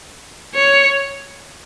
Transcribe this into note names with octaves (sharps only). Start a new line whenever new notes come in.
C#5